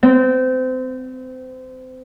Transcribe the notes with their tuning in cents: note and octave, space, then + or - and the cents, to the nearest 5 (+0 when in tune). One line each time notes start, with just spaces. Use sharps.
C4 -30